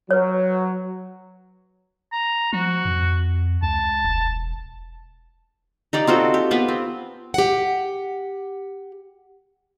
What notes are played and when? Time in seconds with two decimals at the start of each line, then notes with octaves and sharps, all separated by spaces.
0.11 F#3 B4 C#5
2.13 A#5
2.53 F3 F#4
2.85 F2
3.63 C#2 A5
4.05 E1
5.93 D#4 G4 D5 F5
6.07 C4 F4 F#4 A4
6.34 G4
6.51 B3 F4 B4
6.68 C4
7.34 G4 F#5